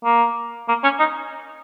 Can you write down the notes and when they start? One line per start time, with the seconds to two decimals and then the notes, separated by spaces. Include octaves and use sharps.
0.04 A#3
0.68 A#3
0.83 C#4
0.99 D#4